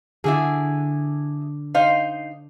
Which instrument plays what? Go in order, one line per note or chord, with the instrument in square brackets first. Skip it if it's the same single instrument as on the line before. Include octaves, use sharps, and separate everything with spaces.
[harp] D3 D4 [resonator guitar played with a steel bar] E4 F#4 G#4
[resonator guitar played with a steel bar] D#4 C5 F5